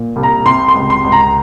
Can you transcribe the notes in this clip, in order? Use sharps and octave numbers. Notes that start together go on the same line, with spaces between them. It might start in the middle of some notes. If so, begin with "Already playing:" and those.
Already playing: A#2
C2
A#5
C3 C6
C6
C#2
C6
C#2
A#5